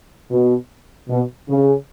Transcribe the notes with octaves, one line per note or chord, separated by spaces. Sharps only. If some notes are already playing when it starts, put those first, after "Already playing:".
B2
B2
C#3